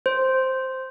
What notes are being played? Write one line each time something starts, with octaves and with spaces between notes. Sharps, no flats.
C5